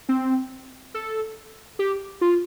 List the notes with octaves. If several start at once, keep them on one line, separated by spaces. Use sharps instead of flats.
C4
A4
G4
F4